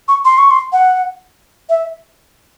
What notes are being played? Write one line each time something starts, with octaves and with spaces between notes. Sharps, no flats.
C#6
C6
C#6
C6
F#5
E5